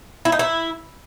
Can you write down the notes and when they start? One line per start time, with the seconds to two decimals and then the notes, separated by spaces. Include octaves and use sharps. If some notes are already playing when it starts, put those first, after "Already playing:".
0.25 E4
0.32 D#4
0.39 E4